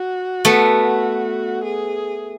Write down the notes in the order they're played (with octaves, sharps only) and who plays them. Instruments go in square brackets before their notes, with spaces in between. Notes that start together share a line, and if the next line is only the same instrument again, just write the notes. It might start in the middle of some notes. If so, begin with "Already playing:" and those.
Already playing: [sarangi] F#4
[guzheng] A3 B3
[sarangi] G#4